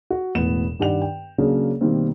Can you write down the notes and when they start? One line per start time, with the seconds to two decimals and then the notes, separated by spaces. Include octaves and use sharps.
0.10 F#4
0.35 E1 A2 B3 E7
0.79 G2 D#3 G4 D5 F#5 F7
1.02 G5
1.38 C#3 F#3 A#3 C#4 D4 G#4
1.81 B2 D#3 G3 A#3 C4